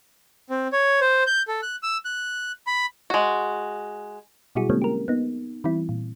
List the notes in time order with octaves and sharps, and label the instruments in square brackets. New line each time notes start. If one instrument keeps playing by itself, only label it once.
[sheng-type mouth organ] C4
C#5
C5
G6
A4
F#6
E6
F#6
B5
[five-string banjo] G#3 F#4
[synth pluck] B2 F#3 G3 E4 F#4 G#4
D3 F#3 G#3 A#3 C4 C#4
G4 A#4
B3 D#4
E3 G3 C4 E4
A#2